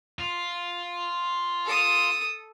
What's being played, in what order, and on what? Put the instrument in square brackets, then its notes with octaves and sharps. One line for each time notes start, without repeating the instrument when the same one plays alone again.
[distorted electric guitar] F4
[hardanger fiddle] A4 D#6